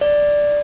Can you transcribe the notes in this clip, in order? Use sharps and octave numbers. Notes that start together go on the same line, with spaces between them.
D5